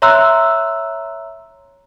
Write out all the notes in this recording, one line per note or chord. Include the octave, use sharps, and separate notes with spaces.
C#5 E5 A#5 C6 E6 F#6